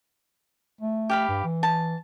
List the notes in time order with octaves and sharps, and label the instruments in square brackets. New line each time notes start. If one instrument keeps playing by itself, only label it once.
[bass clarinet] A3
[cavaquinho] G4 F5 B5
[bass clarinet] G2
E3
[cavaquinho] A5